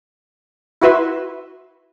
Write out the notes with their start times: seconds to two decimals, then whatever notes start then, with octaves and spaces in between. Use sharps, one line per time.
0.81 E4 F#4 B4 E5 C6